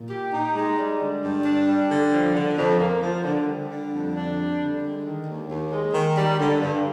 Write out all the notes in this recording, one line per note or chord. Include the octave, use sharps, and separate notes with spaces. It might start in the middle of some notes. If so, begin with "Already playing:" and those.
Already playing: A#2
G4
D#4
G#3
G3
D3
G2
D4
G3
D3
F3
D3
F2
A#3
F3
D3
G3
D3
F2
D4
G3
D3
G#3
D#3
D#2
D#2
G#3
D#3
G3
D3
G2